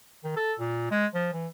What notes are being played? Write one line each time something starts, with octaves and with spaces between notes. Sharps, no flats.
D#3
A4
A#2
G#3
F3
E3